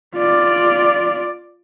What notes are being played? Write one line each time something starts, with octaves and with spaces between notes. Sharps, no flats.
F4 D5